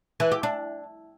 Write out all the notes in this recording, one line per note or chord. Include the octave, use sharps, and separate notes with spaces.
E3
G4
D4